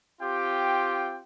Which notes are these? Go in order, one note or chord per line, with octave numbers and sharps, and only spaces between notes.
C4 F4 G4 G5